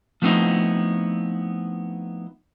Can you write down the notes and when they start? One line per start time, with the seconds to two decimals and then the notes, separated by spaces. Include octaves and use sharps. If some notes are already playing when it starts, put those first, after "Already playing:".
0.22 F3 A3 B3 C4 D#4 E4